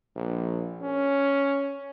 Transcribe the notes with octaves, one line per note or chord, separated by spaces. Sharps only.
A#1
C#4